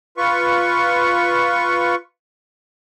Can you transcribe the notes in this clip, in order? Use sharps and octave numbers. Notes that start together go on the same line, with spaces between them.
F4 B4 C#6